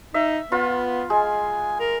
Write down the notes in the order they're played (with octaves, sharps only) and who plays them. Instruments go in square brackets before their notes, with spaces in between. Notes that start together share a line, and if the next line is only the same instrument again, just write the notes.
[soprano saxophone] D#4 [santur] E5
[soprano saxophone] B3 [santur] F4 B5
[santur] G#3 [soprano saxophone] G#5
[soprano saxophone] A#4